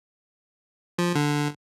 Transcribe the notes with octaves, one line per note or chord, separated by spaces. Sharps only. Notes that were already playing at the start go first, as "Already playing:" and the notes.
F3
D3